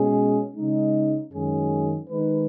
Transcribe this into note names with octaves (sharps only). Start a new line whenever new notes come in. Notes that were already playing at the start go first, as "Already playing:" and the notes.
Already playing: B2 G#3 C#4 G#4
C#3 G#3 D#4
F#2 D#3 G#3 C#4 G#4
D#3 G#3 D#4 B4